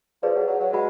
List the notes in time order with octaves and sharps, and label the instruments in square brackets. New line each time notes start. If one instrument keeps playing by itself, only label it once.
[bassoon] F3 [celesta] G#4 B4 D5
[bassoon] F#3
F#3
F#3
[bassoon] G#3 [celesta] F#4 B4 F#5 B5